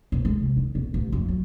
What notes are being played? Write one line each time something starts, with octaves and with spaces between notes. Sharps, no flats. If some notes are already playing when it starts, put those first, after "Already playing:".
E1
G#3
C3
D#3
B1
A1
F2
F#3